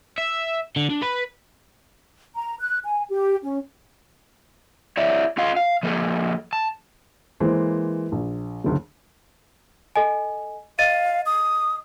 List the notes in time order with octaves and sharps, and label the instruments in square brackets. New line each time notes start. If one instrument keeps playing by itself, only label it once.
[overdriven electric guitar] E5
D3
D4
B4
[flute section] A#5
F#6
G#5
G4
C#4
[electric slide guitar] E4 C#5 D5 E5
C#4 F4 D#5 F5
F5
F3 A#3 G#4 A4
A5
[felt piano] E3 G#3 A#3 C5
A#1
F#1 D2 C#3
[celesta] A4 D#5 G#5
[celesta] D#5 A6 D#7 [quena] F5
[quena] D#6